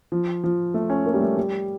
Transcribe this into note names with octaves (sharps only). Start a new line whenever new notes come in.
F3
F3
A3
C#4
A#3
G3
A3
G3